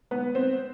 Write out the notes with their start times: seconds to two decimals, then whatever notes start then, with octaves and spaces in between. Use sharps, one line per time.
0.11 B3
0.35 C4